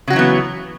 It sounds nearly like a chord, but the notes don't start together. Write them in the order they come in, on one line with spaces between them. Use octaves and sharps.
C#3 F#4 F#3 E3 B3